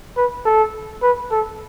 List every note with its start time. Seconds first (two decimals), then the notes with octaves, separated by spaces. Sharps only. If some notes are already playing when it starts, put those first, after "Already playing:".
0.17 B4
0.45 A4
1.03 B4
1.32 A4